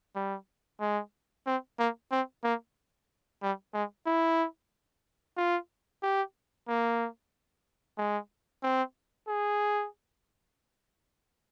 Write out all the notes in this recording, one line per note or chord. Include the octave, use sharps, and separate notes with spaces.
G3
G#3
C4
A#3
C4
A#3
G3
G#3
E4
F4
G4
A#3
G#3
C4
G#4